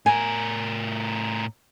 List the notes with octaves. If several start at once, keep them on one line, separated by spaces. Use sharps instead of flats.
A2 A#4 G#5